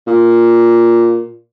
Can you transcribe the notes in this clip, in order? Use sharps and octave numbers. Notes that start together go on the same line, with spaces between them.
A#2